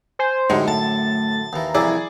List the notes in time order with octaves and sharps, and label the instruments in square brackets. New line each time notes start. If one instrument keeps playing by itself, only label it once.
[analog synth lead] C5 [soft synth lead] G#5
[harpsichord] F#2 A2 D3 [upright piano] G#3 D#4 [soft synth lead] G4
[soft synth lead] A3 [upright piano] A5 [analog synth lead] A6
[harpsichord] D#2 E3 [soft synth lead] A#5
[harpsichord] C2 F2 E3 [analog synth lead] E4 [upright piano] G#4 D5